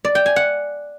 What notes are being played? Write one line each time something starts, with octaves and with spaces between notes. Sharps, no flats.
D5
G5
G#5
F#5